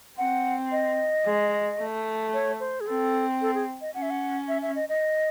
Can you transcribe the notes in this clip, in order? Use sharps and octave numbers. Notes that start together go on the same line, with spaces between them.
C4 F#5
D#5
G#3
A3
C#5
C5
G#4
C4 A4
A4
G#4
D#5
C#4 F#5
E5
F#5
E5
E5
D#5
D#5